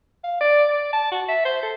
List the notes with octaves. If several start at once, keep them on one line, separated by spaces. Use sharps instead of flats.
F5
D5
D5
A5
F#4
E5
C5
A4